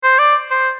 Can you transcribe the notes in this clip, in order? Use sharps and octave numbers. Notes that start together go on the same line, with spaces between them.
C5
D5
C5